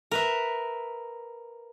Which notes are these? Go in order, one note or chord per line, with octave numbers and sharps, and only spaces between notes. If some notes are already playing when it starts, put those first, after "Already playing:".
A#4 B4 E5